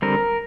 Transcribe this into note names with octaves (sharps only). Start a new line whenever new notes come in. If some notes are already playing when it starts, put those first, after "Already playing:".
D3 G3 C4 A#4